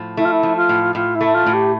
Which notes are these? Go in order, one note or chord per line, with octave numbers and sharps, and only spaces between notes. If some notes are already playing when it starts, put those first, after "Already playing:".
Already playing: A2 F3
A3 E4
F4
E4
F3
F4
A2
A2 F4
E4
A3
F4
A2
G4